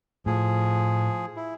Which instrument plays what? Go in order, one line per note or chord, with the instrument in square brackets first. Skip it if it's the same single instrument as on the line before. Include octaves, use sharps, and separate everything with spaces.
[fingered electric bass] A2 [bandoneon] F3 G#4
[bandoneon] E4